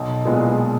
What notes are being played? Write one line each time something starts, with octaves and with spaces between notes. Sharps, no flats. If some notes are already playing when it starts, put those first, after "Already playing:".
Already playing: B1
A#2 G#3 B3 F4